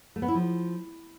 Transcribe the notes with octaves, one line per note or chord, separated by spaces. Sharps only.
A3
B3
E4
F3